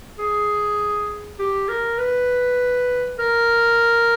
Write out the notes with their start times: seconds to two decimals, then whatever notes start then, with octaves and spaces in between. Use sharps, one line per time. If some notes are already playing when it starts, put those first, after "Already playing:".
0.19 G#4
1.39 G4
1.69 A#4
1.98 B4
3.19 A#4